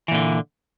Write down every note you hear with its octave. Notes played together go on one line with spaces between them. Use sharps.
A#2 D3 E3